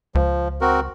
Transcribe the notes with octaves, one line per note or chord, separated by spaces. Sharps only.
C#2 F3
C4 F#4 A#4